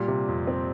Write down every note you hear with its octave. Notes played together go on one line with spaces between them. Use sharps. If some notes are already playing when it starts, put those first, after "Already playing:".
Already playing: A#2 G3
C3
F2
C4